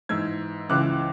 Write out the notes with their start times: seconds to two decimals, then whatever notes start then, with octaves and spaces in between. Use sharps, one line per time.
0.09 G#2 E3 E6 G#6
0.69 C#2 C#3 E3 D6 F#6